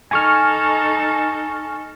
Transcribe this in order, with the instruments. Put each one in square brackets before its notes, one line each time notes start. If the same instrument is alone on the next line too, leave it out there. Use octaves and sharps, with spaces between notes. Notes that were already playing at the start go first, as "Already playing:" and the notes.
[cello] D#4 A4 [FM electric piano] G#5 C#6 F6